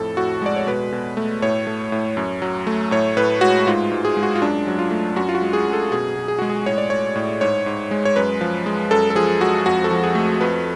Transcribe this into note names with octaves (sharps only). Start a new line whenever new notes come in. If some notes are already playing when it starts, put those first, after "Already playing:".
Already playing: F2 A2 A4
A2 F#4
G#3 D5
C#5
B2 B4
B2
A3
A2 C#5
A3
A2
F#2
F#3
A3
A2 C#5
A2 B4
G#3 F#4
G#2 F4
G#2
G#4
G#3
F#4
F4
F#2 D4
F#3
F4
A3
F#2 F#4
F4
F#4
G#3
G#4
F#2
A4
B2 G#4
B2
G#4
G#3 F#4
G#4
A2 C#5
D5
A3 C#5
A2
G#2 C#5
G#2
G#3
C#5
F#2 B4
F3
G#3
F#2 A4
A4
F3 G#4
G#3 F#4
F2 F#4
A4
F3
G#4
A3
F2 B4